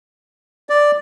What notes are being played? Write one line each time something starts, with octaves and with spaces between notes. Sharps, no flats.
D5